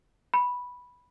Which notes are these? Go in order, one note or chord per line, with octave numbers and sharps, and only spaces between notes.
B5